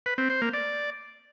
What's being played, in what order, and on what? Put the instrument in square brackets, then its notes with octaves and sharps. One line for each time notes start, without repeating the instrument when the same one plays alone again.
[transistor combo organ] B4
C4
C5
A#3
D5